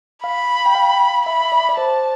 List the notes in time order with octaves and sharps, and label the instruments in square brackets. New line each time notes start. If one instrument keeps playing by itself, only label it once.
[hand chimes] F5 [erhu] B5
[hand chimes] G5
F5
[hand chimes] E5 [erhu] B5
[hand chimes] E5
D5
D5
[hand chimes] C5 [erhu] A5